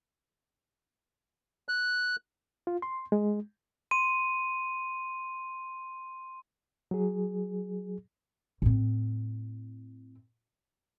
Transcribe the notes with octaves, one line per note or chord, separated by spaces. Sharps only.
F#6
F4
C6
G#3
C6 D#7
F#3 G#4
A2 C4